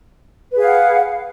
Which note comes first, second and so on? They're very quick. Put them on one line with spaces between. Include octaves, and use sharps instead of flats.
B4 G#4 F5 F#5